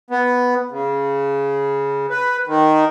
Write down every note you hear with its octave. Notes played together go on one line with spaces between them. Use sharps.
B3
C#3
B4
D#3